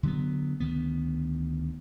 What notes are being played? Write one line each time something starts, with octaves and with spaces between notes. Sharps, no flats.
D3 F#3 B3
D2 D#3 B3